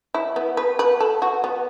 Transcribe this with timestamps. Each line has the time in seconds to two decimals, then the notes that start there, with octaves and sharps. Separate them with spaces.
0.14 E4
0.36 B3
0.57 B4
0.79 B4
1.00 A4
1.22 F#4
1.44 B3